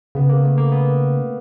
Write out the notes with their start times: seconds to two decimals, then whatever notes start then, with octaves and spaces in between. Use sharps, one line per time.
0.15 C#3 B3
0.29 A#3
0.45 A3
0.58 A#3
0.72 B3